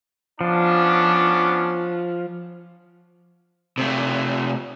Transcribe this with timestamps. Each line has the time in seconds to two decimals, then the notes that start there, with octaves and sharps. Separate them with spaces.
0.41 F3 B3 C#4 D4
3.78 C3 A3